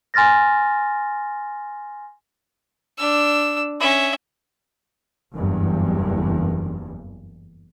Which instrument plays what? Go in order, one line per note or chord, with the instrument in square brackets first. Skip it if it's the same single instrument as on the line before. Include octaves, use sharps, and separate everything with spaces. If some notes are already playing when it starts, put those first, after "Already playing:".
[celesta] G#5 C6 F6 A6 A#6
[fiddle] D4 E6
C#4 E5
[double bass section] F#1 E2 G2